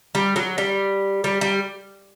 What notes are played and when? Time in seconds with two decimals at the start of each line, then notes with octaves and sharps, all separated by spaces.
0.15 G3
0.36 F#3
0.58 G3
1.24 G3
1.41 G3